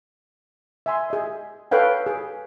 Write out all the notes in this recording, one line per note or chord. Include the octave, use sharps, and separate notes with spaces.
E5 G#5 C6
G#4 D#5
A4 B4 C#5 F5 G5
G#4